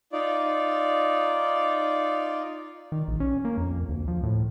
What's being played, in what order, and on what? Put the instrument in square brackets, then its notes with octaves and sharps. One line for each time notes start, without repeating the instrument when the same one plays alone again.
[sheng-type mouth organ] D#4 F4 D5
[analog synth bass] D#3
A#1
C#4
A#3
F2
D2
F3
A2